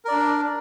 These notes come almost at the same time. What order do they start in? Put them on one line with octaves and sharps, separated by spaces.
A#4 D5 D4